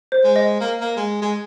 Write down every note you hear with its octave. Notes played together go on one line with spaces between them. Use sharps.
C5
G#3
D#5
A#3
A#3
G#3
G#3